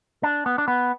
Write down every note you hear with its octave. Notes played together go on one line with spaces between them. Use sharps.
D4
B3
D4
B3